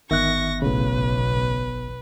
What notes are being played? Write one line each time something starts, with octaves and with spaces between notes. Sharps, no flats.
G1 D#3 B3 E5 C#6 F#6 A#6
B1 A2 C#3 B4